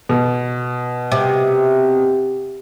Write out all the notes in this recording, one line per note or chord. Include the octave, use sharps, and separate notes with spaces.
B2
C3